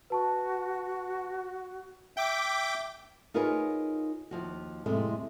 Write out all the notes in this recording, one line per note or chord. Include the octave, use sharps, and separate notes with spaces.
F#4 B4 A5 C#6
E5 G5 D6
D#4 F4 G#4 A#4 B4 C#5
D#2 F3 F#4
F2 A2 C3 G#3 A3